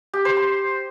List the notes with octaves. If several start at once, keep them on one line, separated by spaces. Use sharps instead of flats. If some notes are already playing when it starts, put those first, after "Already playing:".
G4
C5
C6